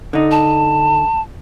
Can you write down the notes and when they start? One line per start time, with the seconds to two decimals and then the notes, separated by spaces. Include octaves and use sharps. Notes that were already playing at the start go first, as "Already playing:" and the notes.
0.13 D3 D#4
0.31 A5